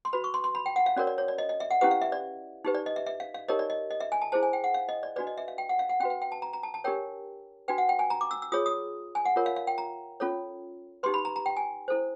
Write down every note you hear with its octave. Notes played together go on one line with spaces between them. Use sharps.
C6
F#4 B4 B5
C#6
C6
C6
B5
G5
F#5
F5
C#4 F#4 A#4 C#5 D5
D5
C#5
D5
D#5
D#5
E5
F#5
C#4 E4 G4 B4 F#5
F5
E5
D5
D#4 G4 B4
D5
D#5
E5
E5
F5
F5
D#4 G4 A#4 C#5 D#5
D5
D#5
D#5
E5
G#5
A5
E4 G#4 C5 A5
G#5
G5
F#5
F5
D#5
D5
D4 F#4 B4 D5
D#5
E5
F5
G5
F#5
F5
F#5
C#4 F#4 B4 G5
G5
G5
A5
A#5
A#5
A5
A5
D4 G4 A#4 C#5 G5
D4 F#4 B4 G5
F#5
G5
G#5
A#5
D6
E6
E6
F4 G#4 C#5 D#6
D#6
G#5
F#5
F4 A#4 C#5
F5
F5
G5
A#5
C#4 F4 A4 C#5
D#4 G4 B4 C6
B5
A#5
A#5
G5
G#5
E4 A4 C5